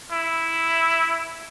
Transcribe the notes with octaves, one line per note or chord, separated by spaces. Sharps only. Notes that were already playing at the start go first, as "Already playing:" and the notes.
E4